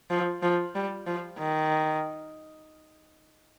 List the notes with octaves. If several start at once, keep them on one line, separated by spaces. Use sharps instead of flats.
F3
F3
G3
F3
D#3